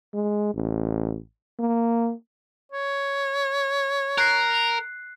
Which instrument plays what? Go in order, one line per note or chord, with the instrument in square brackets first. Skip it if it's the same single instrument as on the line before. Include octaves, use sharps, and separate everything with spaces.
[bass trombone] G#3
A1
A#3
[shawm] C#5
[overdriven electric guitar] A#4 [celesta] F#6 C7